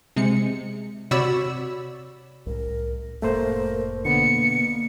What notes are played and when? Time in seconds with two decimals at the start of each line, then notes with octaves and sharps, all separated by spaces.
0.16 C3 G#3 C#7
1.11 C3 F#4 C#5 D5 B5 E6
2.46 C2 A2 C#4 A#4
3.22 F1 A2 A3 A#3 A#4 C5
4.05 B2 D3 A#3 B3 C#7